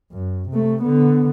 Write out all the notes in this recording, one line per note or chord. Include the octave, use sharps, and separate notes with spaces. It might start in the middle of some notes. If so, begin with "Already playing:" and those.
F#2
C3 A3
D3 B3